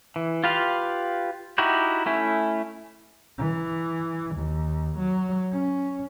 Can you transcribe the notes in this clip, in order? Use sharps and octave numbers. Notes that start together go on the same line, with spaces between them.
E3
F4 G4 B4 F5
D#4 E4 F#4 G4
A3 C#4 E4
E3
D#2
F#3
C#4